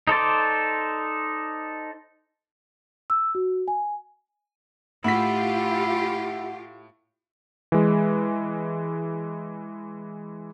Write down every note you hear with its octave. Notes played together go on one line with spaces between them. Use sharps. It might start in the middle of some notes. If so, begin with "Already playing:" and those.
D#4 A4 C5 D5
E6
F#4
G#5
A2 E4 F4 G4 F#5 B6
E3 G#3